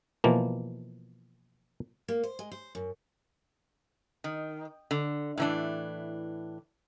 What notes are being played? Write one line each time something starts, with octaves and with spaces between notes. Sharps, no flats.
B2 E3 F3 A#3
A#3
C5
G#3
C5
F#2
D#3
D3
A2 E3 D4